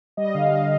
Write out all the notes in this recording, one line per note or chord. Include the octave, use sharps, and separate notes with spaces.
G3 D#5
D3 F5
D3